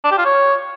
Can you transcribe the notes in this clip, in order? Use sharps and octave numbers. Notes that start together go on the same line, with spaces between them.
D4
G4
F4
C#5